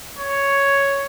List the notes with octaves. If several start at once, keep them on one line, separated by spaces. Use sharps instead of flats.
C#5